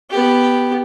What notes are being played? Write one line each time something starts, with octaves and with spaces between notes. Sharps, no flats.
B3 G4